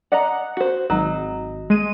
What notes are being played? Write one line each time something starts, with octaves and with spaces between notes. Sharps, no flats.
D5 D#5 F#5 A#5
F#4 C5
G#1 F#3 D#4
G#3 D#7